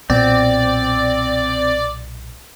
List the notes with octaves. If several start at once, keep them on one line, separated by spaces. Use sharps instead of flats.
B1 A#2 B3 C4 D5